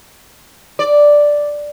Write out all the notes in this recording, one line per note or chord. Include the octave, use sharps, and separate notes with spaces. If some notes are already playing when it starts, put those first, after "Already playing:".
D5